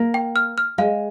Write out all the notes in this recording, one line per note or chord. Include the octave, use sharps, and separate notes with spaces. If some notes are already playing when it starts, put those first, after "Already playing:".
Already playing: A#3
G5
F6
F6
G#3 F5